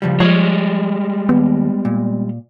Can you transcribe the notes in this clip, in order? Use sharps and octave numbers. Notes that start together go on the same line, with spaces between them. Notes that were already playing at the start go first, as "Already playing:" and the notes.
C#3 F3 G3
F3 G3 G#3 C#5
D#2 B3
A#2